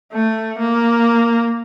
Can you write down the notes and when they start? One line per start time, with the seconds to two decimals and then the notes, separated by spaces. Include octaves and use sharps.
0.12 A3
0.58 A#3